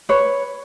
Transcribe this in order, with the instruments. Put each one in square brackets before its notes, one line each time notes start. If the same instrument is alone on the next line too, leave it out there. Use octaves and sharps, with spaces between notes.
[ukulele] B4 C#5